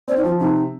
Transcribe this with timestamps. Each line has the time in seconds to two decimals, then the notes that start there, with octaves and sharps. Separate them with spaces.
0.08 C4 D5
0.16 D#4
0.23 F3 F4
0.40 C3 D#4